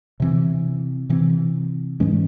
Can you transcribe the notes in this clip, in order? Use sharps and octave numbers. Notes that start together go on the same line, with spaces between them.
C3 E3 C4
C3 E3 C4
G#2 E3 G#3 C#4